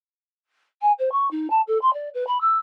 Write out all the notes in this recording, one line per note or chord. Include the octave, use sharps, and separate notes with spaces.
G#5
C5
C#6
D#4
A5
A4
C6
D5
B4
B5
E6